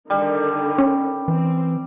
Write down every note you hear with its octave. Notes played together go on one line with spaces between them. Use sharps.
D3 D#3 G3
C#4
E3 C4